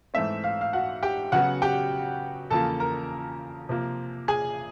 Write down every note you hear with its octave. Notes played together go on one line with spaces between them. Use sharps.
G#2 E3 A3 C4 E5
F5
F5
F#4 F#5
G4 G5
C#3 F#3 B3 F#4 F#5
G4 G5
E2 C#3 F3 A#3 A4 A5
A#4 A#5
C3 F3 A#3
G#4 G#5